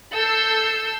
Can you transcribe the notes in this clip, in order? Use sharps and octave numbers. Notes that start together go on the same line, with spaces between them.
A4 E6 G6 C7